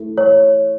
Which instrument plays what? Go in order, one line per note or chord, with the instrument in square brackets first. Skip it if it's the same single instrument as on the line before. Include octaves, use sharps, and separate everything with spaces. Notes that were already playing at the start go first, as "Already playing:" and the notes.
Already playing: [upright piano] A3 E4
[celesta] C#5